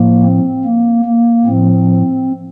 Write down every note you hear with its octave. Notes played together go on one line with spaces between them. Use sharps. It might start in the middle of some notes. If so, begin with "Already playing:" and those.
Already playing: A2 F3 A#3
C4
A#3
A#3
A2 F3 C4